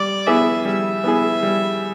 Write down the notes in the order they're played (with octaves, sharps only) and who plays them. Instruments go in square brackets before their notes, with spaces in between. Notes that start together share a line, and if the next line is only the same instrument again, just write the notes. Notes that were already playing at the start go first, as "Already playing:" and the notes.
Already playing: [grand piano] G3 [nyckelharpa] D5
[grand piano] B3 E4 G#4 [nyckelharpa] E5
[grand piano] G3 [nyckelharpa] E5
[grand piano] B3 E4 G#4
G3